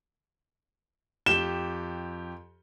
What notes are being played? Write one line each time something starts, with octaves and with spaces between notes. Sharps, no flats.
F2 G4 E7 G7